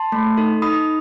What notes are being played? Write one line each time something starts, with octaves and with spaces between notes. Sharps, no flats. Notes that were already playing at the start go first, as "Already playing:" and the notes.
Already playing: A5 C6
A3
D#4 A4
D#4 B5 D#6